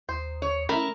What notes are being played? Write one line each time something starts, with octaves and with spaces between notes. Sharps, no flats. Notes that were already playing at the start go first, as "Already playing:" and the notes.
D#2 C5
C#5
A3 C#4 E4 A#4 A#5 B5